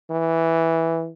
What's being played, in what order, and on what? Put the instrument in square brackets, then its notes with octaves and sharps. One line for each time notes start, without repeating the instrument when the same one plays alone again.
[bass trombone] E3